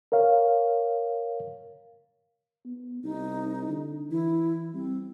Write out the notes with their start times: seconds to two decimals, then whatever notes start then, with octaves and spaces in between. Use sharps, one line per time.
0.12 A#4 C#5 F5
2.65 B3
3.04 C2 D#4
3.69 D3
4.11 E3 E4
4.74 G3 C4